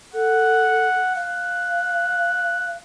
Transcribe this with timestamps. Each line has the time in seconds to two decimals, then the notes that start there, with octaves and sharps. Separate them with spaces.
0.14 A4 F#5
1.15 F5 F#6